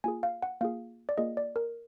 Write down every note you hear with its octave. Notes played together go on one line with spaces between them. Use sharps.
A#3 F4 G#4 G#5
F5
F#5
A#3 F4 G#4 F5
D5
A#3 F4 G#4 D#5
D5
A#4